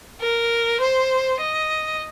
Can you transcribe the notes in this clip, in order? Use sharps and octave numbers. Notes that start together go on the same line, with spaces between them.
A#4
C5
D#5